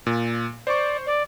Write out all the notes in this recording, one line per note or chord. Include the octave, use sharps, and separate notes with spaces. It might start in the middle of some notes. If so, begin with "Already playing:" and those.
A#2
C5 D5 C#6
D5